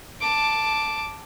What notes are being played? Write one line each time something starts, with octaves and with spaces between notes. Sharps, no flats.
A5 D6